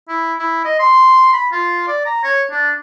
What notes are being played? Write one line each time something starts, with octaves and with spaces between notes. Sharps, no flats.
E4
E4
D#5
C6
B5
F4
D5
A#5
C#5
D4